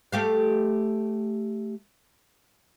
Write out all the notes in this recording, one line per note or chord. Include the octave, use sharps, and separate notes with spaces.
A3 G4 F5